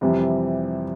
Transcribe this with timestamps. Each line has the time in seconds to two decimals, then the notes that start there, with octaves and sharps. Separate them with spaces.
0.01 F2 C3 E3 G3